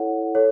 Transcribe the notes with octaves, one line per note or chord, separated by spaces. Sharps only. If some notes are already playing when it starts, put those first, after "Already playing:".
Already playing: E4 A4 C#5 F#5
A4 C#5